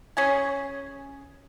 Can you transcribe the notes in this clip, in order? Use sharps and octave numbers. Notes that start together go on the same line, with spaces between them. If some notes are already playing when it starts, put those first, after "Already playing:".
C#4 G#4 G#5